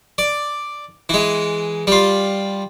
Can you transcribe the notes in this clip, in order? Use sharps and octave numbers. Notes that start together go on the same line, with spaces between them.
D5
E3 G#3
G3 F4